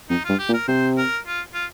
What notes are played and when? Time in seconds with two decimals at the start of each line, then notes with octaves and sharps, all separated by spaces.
0.10 F2 D#4
0.25 G2 F4
0.39 G4
0.49 A#2
0.54 A#4
0.68 C3 C5
0.97 A#4
1.27 F4
1.54 F4